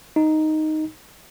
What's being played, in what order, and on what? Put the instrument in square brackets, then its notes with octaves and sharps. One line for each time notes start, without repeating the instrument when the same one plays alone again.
[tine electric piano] D#4